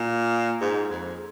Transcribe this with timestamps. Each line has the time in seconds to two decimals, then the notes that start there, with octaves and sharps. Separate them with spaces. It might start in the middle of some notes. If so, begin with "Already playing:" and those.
Already playing: A#2
0.61 G#2
0.90 F2